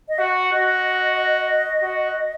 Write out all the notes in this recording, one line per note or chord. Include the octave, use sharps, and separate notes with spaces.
D#5
F#4 F#5
F#4 D#5
F#4